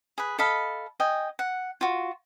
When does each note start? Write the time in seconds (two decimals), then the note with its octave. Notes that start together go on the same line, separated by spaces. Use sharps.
0.18 G#4 B4
0.39 A4 D#5 F5 B5
1.00 D#5 G5 G#5
1.39 F#5
1.81 F4 F#4